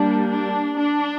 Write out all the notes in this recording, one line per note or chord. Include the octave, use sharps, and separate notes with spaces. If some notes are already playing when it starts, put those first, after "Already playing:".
Already playing: G3 A#3 D4
D4
D4